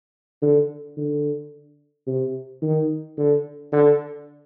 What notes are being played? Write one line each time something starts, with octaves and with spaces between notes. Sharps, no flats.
D3
D3
C3
D#3
D3
D3